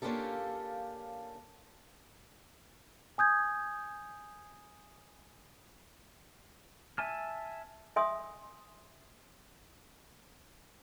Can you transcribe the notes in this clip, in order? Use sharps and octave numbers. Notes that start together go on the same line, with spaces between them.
A#3 C#4 D4 F4 G4 A4
G#5 D#6 G6 G#6
E5 G#5 A5 F6
E5 G#5 C6 D#6